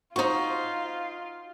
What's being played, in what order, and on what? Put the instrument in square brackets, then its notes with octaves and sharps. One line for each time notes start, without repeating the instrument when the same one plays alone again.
[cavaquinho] D#4 C#6 [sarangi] F4 [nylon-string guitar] F#4 C5